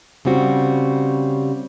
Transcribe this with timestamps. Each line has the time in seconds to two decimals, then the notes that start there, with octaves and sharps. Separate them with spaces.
0.25 C#3 G3 C4 F#4